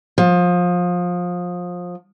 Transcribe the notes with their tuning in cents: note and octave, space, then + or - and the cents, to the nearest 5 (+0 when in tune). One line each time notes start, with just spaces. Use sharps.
F3 +25